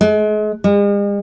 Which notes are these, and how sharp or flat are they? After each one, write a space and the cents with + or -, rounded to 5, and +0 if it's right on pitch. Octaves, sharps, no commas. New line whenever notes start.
G#3 +35
G#3 -45